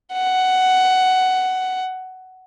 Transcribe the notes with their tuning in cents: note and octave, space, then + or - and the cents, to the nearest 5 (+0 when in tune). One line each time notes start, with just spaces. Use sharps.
F#5 +10